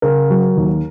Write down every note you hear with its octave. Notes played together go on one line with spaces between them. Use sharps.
C#3 A#4
F#3
D#2